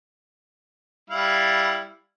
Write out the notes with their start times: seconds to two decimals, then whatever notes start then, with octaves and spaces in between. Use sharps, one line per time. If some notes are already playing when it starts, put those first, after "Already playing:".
1.10 G3 E4 F5